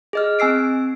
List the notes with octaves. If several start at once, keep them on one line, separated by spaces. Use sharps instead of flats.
G#4 D#5 F6
C4 G#5 E6 C7 D7